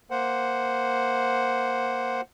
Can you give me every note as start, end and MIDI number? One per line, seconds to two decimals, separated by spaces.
0.10 2.21 58
0.10 2.21 72
0.10 2.21 78